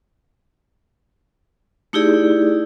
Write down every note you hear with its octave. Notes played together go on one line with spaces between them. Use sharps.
A3 D#4 E4 G4 G#4 D5